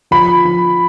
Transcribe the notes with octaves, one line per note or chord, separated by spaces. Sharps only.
F3 B5
F3